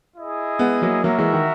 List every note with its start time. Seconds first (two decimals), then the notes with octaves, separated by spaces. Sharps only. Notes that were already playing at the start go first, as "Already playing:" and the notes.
0.15 E4 G#4 D#5
0.59 G#3 B3
0.82 F#3 A#3
1.03 F#3 A#3 F#4 A#4 E5
1.18 E3 G#3
1.33 D#3